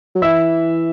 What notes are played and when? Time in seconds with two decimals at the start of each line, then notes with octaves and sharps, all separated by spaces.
0.15 F#3
0.22 E3 E5 E6